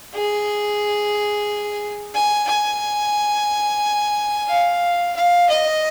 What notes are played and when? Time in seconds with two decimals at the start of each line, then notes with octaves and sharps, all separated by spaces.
0.14 G#4
2.15 G#5
2.48 G#5
4.49 F5
5.16 F5
5.49 D#5